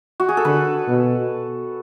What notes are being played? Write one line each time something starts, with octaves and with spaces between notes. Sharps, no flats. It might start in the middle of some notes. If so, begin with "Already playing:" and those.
F#4
G#4
A4
D3 B4
B2